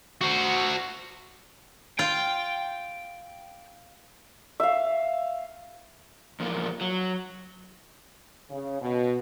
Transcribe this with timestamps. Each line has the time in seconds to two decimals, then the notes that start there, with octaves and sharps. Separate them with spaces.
0.21 F#4 C5
1.99 F4 G5
4.60 E5 F5
6.40 E2 A#2 F3 A#3
6.81 F#3
8.49 C#3
8.81 B2